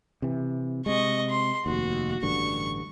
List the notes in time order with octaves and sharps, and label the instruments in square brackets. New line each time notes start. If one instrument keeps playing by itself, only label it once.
[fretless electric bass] C3 E3
[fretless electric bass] C3 G#3 [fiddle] D#5 C#6
[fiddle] C6
[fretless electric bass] F1 D#2 [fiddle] F#4
[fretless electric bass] A1 G2 D3 [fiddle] C#6